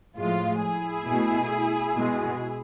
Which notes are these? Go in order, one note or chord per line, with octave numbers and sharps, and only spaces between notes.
A2 F3 G#3 F4
E4 G#4
B2 A3
B2 G#3